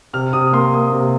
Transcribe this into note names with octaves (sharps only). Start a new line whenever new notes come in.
C3 F6
C3 D#6
A#3 C6
A#3 D#6
C3